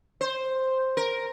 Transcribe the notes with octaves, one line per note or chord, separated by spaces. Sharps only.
C5
A#4